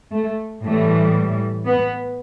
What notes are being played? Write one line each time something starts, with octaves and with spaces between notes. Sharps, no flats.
A3
A2 E3 G3 A3
B3